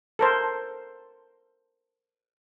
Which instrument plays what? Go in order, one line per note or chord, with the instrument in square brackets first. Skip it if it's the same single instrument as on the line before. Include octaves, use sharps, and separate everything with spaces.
[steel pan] A4 A#4 C5